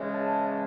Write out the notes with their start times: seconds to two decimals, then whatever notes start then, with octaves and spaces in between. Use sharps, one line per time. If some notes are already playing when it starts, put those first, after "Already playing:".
Already playing: C#3 E3 G#3 C#4
0.14 A5